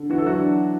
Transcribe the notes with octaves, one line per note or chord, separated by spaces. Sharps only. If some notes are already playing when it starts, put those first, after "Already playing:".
Already playing: D3
E3 F#4
A4
F#3 F#4
D4